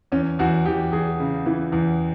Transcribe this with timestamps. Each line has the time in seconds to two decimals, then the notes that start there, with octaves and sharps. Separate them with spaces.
0.12 E2 C#4
0.39 E2 F#4
0.65 E2 G4
0.92 E2 G#4
1.20 C#3
1.46 E3
1.72 E2